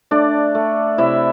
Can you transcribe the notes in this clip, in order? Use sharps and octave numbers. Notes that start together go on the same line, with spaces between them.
A3 D4 D5
A3
C3 E4 E5